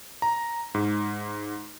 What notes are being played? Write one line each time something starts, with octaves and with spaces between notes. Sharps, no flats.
A#5
G#2